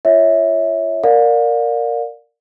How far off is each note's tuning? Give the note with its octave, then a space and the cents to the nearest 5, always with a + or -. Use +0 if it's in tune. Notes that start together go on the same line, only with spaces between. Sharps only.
F4 -30 C#5 +0 E5 -20
A#4 -10 D5 +0 F5 +35